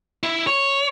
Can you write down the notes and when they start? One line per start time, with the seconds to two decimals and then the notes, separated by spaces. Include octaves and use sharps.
0.23 E4
0.47 C#5